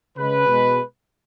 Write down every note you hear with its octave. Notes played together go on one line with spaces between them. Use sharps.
C#3 G#3 B4
B2 G#3